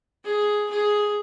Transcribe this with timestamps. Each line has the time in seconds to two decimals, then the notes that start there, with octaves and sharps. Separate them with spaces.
0.25 G#4
0.71 G#4